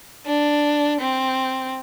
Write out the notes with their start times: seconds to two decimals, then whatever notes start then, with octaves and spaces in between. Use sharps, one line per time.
0.26 D4
1.00 C4